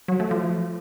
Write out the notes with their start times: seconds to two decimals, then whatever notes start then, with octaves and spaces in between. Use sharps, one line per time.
0.08 F#3
0.20 A3
0.31 F3